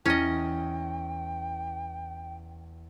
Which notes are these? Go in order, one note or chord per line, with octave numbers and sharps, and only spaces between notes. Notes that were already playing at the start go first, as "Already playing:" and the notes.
E2 C#4 E4 D#5 G5 F6